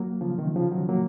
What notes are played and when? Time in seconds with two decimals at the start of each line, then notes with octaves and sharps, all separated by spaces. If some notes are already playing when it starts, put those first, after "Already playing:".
Already playing: F#3 A#3
0.21 C#3 F3
0.38 C3 D#3
0.56 C#3 F3
0.72 D#3 F#3
0.89 F#3 A#3